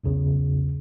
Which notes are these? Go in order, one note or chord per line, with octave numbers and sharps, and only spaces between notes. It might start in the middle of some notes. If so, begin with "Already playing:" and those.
B1 E2 C#3